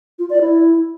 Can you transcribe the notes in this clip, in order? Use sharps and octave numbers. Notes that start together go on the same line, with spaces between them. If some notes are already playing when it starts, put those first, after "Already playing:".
F4
D5
E4